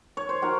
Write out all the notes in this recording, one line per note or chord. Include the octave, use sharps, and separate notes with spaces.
C#5
C5
D#3 F#4 A#4